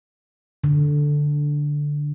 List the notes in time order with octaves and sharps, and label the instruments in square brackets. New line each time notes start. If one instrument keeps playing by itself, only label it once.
[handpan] D3